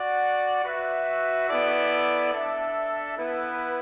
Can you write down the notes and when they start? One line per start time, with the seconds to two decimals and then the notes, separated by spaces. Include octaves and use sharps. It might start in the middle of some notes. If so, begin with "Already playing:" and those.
Already playing: F#4 D5 F#5
0.64 F#4 B4 E5
1.48 B3 E4 A4 D5
2.33 D4 A4 E5
3.18 B3 E4 B4